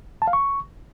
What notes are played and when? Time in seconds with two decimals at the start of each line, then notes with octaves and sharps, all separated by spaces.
0.22 A5
0.27 F5
0.33 C#6